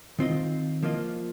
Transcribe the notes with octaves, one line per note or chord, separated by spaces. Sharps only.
D#3 C4 F4 D#5
F3 A#3 F4 D#5